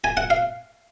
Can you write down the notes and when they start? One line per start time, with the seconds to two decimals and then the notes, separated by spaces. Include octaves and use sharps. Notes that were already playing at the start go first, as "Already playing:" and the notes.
0.04 G#5
0.17 F#5
0.30 F5